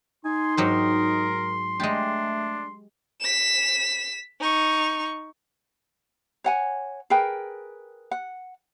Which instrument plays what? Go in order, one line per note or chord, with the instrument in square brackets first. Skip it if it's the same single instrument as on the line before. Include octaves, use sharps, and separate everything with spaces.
[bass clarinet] D#4 [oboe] G#5 [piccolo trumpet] C6
[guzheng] G#2 F#3 G4 [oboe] A#4
[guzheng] G#3 G4 [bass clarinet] A3 [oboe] D4
[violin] B6 E7
D#4 C#6
[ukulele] C#5 F#5 G#5
G#4 A#4 B4 G5
F#5